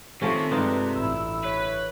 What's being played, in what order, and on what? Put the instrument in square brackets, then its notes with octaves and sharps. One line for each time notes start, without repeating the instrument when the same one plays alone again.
[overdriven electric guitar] C3 [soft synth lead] D#3 [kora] F3 A3 C#4
[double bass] G2 G#3 [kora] D4 D#4 F4 [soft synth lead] B4
[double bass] A1 E4 [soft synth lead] E6
[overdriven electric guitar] B4 [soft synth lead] C#5